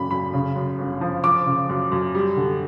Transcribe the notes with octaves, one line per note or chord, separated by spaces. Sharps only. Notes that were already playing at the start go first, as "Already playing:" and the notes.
Already playing: F#2 C#3 B5
F#2 B5
C#3
F#2
G1
F3
F3 D6
C#3
F#2
F#2
G3
D3